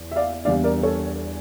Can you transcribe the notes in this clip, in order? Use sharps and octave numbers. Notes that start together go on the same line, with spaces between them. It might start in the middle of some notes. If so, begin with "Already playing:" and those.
Already playing: E2
E5
D5 F5
E2 E3 G3 D4 D5 F5
A#4 D5
A4 C#5